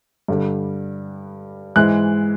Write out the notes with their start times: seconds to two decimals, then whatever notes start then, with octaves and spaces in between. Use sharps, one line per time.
0.28 G2 D3 G3
1.76 G#2 E3 G#3 F#6